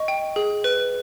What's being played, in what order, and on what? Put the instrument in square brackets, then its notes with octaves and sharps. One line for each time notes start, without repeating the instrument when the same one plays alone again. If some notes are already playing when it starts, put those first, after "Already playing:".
Already playing: [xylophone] D#5 C#6
G5
G#4
B4